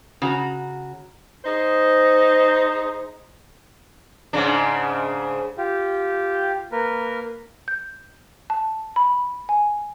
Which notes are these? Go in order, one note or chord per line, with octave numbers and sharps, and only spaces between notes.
C#3 F#4 A#5
D#4 G#4 C5
G#2 C#3 D4
F4 G4
A#3 A#4 B4
G6
A5
B5
G#5